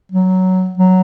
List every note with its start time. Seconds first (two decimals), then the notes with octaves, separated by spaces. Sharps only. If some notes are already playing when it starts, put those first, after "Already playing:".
0.12 F#3
0.78 F#3